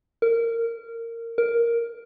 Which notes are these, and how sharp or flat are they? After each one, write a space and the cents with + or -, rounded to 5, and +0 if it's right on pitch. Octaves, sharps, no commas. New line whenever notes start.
A#4 -20
A#4 +5